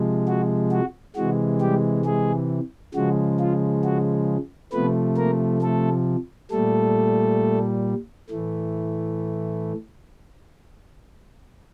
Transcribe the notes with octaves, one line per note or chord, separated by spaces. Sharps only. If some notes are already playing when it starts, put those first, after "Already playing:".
Already playing: C3 F3 G#3
F#4
F#4
C3 E3 G#3 F#4
G3 G4
G#3 G#4
C#3 F3 G#3 F#4
F4
F#4
C3 F3 A3 B3 B4
A#3 A#4
A3 A4
A#2 G3 A3 A4
A2 E3 A3